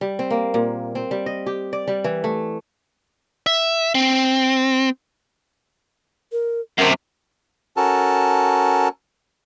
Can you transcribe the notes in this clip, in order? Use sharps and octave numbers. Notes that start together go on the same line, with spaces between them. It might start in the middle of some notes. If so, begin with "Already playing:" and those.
G3
C4
A#3
A#2
C4
G3
D#5
G4
D5
G3
E3
A3
E5
C4
A#4
F#2 C3 A#4
C#4 F#4 A4 A#4 A5